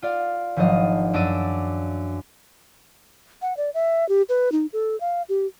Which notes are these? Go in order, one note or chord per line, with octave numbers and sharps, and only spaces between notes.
F4 D5 F5
G#1 F3 F#3 D4 D#5 F5
F#2 D4 D6 E6 A#6 D#7
F#5
D5
E5
G4
B4
D#4
A4
F5
G4